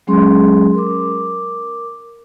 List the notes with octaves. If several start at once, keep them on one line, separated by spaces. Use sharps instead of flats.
F#3 G#3 C#4 G#4 C6
A#4 D6